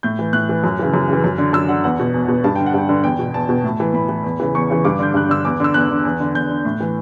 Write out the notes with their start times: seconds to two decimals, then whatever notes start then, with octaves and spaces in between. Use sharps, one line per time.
0.03 A2 G6
0.19 E3
0.33 A2 F#6
0.49 E3
0.64 F#2
0.79 C#3 E3
0.94 F#2
1.08 C#3 E3
1.24 F#2
1.38 D3
1.53 F#2 E6
1.68 D3 F#5
1.84 E2 F#5
2.00 B2
2.14 E2
2.28 B2
2.44 G2 A5
2.56 D3 G5
2.66 F#5
2.74 G2 G5
2.89 D3
3.04 E2 G5
3.19 B2
3.34 E2 A5
3.49 B2
3.64 A2
3.80 E3
3.94 A2 B5
4.09 E3
4.24 E2
4.40 C#3 E3
4.55 E2 C#6
4.70 C#3 E3
4.85 G2 D6
4.99 D3 G6
5.14 G2 F#6
5.29 D3 E6
5.45 E2 D6
5.60 D3 E6
5.74 E2 F#6
5.90 D3
6.05 E2
6.20 D3
6.34 E2 G6
6.49 D3
6.65 A2
6.80 E3